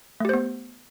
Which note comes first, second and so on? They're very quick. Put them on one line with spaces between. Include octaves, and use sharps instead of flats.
A3 G4 C5 B3